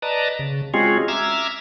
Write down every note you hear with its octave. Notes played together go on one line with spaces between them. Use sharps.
B4 D5 D#5 A5 A#5
C#3
G#3 C4 C#4 F4 F#4 G#4
E5 A#5 D6 E6 F6 G#6